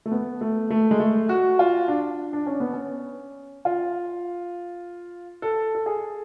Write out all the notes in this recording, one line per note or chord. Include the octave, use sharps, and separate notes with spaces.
A3
B3
A3
A3
G#3
A3
F#4
F4
D4
D4
C#4
B3
C#4
F4
A4
A4
G#4